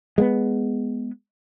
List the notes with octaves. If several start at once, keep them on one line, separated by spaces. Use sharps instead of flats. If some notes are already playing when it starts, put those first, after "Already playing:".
G#3 A#3 B3